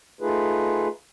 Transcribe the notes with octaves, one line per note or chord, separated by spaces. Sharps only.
A3 D#4 F4 G#4 B4